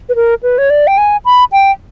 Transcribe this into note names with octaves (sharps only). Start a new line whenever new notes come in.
B4
A#4
B4
C#5
D5
G5
G#5
B5
G5